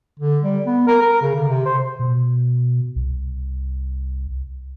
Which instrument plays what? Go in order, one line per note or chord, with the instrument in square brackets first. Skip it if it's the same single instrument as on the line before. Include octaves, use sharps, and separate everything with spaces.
[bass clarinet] D3
G3
B3
A#4
A#4
C#3
D3
C3
C5
[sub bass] B2
C2